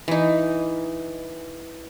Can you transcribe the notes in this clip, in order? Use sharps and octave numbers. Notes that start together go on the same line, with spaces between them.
E3 D#4